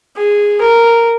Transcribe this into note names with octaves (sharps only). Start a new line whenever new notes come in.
G#4
A#4